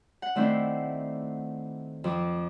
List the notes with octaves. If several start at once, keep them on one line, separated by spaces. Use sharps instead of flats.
F#5
D#3 A3 C4 D4 E4 C5
F2 F3 D6